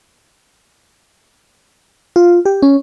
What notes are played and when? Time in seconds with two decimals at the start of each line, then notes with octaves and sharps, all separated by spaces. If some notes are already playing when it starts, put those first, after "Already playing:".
2.16 F4
2.45 G4
2.62 C#4